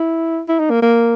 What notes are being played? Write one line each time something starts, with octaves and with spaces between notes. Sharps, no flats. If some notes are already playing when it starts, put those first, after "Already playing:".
Already playing: E4
E4
D#4
A#3
A#3